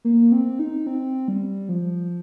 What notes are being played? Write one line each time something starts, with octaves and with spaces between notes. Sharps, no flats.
A#3
C4
D#4
C4
G3
F3